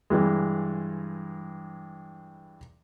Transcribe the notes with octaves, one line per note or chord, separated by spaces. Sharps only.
G2 E3 G#3